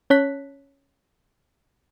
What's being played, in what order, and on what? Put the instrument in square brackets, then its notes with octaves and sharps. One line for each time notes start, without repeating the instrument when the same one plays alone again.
[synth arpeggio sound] C#4 C#5 A5 F#6 B6